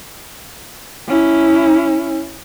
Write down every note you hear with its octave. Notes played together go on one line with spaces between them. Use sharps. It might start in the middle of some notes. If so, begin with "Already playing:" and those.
C#4 E4